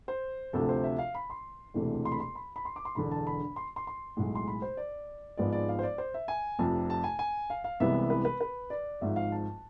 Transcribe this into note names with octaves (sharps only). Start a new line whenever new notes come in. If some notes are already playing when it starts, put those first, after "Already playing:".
C5
D2 C3 F3 A3 A4
C5
E5
F5
B5
C6
E1 D2 C3 E3 A3
C6
B5
C6
B5
B5
C6
D6
C6
E1 E2 D3 B5
A5
B5
C6
C6
C6
B1 A2 G#3
C6
B5
C5
D5
G#1 G#2 F3 G#3 B3 D5
D5
F5
C5
D5
C5
E5
G#5
F1 F2 C3 A5
A5
G#5
G#5
F5
F5
C2 C3 E3 G#3 B3 E5
B4
B4
B4
D5
G#1 G#2 F3 E5
F5
A5